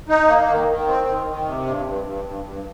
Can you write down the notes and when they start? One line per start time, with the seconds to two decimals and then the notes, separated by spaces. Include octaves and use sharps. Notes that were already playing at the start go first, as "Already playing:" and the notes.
0.09 D#4
0.28 A#3
0.47 D#3
0.68 D#3
0.87 C4
1.07 D#3
1.26 D#3
1.46 C3
1.66 G2
1.85 G2
2.05 G2
2.25 G2
2.44 G2